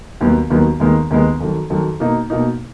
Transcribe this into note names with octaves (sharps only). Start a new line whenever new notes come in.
D#2 D#3 F#3 B3
D#2 D#3 F#3 B3
D#2 D#3 G#3 B3
D#2 D#3 G#3 B3
F2 D#3 F#3
F2 D#3 F#3
B2 A#3 D#4
B2 A#3 D#4